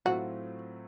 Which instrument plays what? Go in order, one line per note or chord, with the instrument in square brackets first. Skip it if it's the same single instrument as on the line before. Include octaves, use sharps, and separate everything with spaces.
[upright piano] A2 F#3 A3 C4 F4 [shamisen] F#4